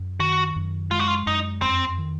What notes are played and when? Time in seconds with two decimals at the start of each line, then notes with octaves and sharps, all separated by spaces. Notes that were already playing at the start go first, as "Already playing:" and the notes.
Already playing: F#2
0.20 D#3 F#4
0.56 F#2
0.91 G#3 F4
1.00 F#4
1.08 F4
1.27 F#2 D#4
1.62 F2 C4
1.98 D#3